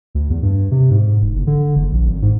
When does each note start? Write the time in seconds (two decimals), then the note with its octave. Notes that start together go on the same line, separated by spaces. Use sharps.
0.15 D2
0.30 E2
0.43 G2
0.71 C3
0.91 G#2
1.22 E1
1.36 F#1
1.47 D3
1.76 F#1
1.92 A#1
2.06 G#1
2.22 G#2